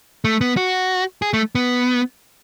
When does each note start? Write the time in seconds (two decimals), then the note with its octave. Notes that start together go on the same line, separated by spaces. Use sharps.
0.25 A3
0.41 B3
0.57 F#4
1.22 G#4
1.33 A3
1.55 B3